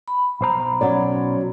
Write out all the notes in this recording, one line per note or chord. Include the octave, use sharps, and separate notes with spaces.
B5
B1 C5 A#5
F#3 C#4 D5